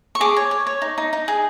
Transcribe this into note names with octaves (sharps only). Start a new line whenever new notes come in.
C#6
G#4 D6
C#5
C#5
C#5
D#4
D#4
D#4
G#4